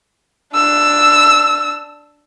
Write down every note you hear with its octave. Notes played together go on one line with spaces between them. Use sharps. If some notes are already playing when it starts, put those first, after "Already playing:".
D4 E6